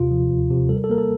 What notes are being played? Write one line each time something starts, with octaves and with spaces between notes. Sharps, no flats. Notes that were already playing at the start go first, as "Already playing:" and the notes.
Already playing: D#2 C3 F4
F3
D2
C3
G3 A4
A#4
A4
A#3 A#4
A4